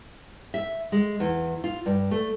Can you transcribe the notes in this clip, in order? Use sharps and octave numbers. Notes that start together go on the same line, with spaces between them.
E5
G#3
E2
F4
G2
A3